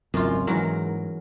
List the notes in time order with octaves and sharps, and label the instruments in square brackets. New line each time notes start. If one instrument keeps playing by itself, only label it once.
[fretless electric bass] G#1 C#2 [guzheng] F#2 F4
[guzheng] E2 F#3 A#4 [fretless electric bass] G#2